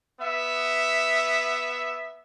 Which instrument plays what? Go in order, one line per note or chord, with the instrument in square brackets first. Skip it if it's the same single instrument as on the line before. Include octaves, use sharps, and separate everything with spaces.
[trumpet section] B3 E5